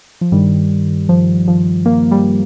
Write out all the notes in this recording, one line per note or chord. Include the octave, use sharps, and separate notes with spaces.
F3
G2 D#3 G3
F3
F3
A#3
G3